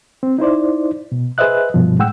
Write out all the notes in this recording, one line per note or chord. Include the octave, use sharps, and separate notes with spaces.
C4
D#4 E4 C5 D5
B2
G#4 B4 C5 D#5 E5 F#6
G2 B2 F3
A2 G#3 F#5 G5 E6